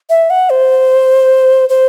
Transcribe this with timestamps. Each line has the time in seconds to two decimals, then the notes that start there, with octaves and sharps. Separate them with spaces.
0.10 E5
0.30 F#5
0.50 C5
1.69 C5